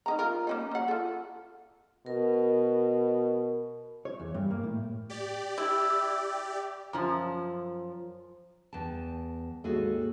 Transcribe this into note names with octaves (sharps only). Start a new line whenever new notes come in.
C#4 D#4 A#5
F4 A#4
A#3 C#4 D#4
F#3 F#5
F4 A4
B2 A#4
C#5
E2
G2
A#3
A2
G4 D5
E4
F#2 F3
E2 G5 A5
D#2 G#2 F#4 G#4 A4